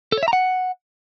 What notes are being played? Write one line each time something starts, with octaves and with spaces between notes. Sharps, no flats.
A4
C#5
E5
A#5
F#5